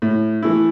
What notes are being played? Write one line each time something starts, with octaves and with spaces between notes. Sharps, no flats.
A2
E3 A3 E4